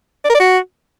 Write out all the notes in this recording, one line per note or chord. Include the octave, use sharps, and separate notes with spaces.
D5
A#4
D5
F#4